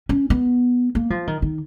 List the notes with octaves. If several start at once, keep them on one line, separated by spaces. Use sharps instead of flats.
C#4
B3
A#3
F3
D#3
D#3